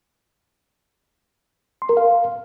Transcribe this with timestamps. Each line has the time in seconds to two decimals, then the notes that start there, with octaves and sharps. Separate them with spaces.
1.82 C6
1.89 A#4
1.97 F5